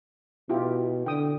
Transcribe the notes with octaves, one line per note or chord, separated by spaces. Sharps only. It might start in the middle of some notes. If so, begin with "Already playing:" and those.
B2 E4 F4 G4
D3 G5 D#6